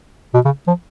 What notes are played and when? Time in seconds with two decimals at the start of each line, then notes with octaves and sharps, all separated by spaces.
0.34 B2
0.45 C#3
0.67 F3